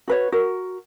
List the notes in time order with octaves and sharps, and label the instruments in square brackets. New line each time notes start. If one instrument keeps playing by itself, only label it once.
[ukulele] F#4 B4 C#5
F#4 A#4